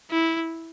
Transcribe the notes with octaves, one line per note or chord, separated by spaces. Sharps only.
E4